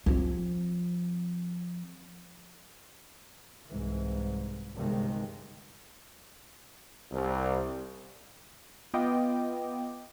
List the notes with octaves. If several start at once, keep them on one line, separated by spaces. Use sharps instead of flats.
F3 C4
C2 G#2 E3
G1 G2 C3 D#3 G#3
C2
B3 F4 D#5 G5 D6